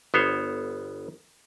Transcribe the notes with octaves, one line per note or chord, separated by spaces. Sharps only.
G1 B3 C5 C#5